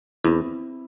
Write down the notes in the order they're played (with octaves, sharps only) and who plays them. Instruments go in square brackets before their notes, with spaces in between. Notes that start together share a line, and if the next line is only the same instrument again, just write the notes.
[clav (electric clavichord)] E2 [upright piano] C4 E4